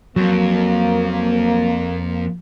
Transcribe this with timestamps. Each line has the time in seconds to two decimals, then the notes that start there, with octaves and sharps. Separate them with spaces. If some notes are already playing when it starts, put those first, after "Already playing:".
0.16 F2 F#3 A#3